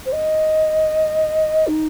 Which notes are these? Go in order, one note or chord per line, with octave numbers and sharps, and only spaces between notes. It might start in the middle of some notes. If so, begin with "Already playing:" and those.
C5
D#5
D#4